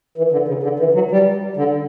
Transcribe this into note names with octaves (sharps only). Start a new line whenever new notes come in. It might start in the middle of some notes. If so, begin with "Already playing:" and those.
E3
D3
C#3
D3
E3
F#3
G3
D3